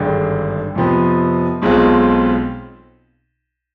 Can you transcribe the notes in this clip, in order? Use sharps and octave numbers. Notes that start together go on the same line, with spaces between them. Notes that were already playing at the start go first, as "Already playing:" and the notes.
Already playing: G#1 G2 D3 G#3
F2 C3 F3 B3
B1 B2 G#3 C4 F4